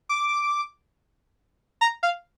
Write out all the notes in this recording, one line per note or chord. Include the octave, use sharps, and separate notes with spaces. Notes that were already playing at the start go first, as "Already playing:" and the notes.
D6
A#5
F5